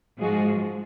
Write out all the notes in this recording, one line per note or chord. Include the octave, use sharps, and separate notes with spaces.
G#2 F3 G#3 F#4 G#4